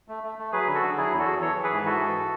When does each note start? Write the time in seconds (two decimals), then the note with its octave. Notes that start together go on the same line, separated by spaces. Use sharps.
0.08 A3
0.23 A3
0.38 A3
0.52 F#3 G#4 B4
0.67 D3
0.75 F#4 A4
0.82 D3
0.97 F#3 E4 G#4
1.12 E2
1.19 F#4 A4
1.27 F#3
1.41 E3 A4 C#5
1.56 E3
1.63 G#4 B4
1.71 G#2
1.77 B4
1.85 E3 F#4 A4
2.00 G#2